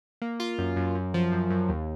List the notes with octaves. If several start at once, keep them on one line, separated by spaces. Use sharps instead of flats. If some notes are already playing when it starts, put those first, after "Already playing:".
A#3
F4
F#2
F#2
F#2
F3
F#2
F#2
D#2